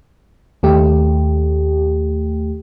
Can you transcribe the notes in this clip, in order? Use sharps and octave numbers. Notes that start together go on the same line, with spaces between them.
D#2 A3 G4